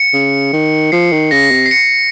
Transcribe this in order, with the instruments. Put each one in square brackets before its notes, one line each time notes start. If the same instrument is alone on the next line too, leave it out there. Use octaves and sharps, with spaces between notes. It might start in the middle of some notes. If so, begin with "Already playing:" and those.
Already playing: [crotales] C#7
[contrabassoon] C#3
D#3
[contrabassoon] F3 [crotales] C7
[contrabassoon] D#3
[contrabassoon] C#3 [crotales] A#6
[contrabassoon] C3
[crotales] C7
C#7